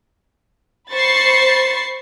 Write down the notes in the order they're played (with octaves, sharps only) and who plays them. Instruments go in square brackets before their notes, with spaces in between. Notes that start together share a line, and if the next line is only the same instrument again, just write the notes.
[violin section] C5 B5 C#6 A6 C7